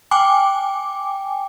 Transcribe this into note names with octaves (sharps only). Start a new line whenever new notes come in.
G5 G#5 D6